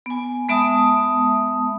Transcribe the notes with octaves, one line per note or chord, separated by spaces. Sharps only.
B3 G#5
G#3 B3 E5 A5 D#6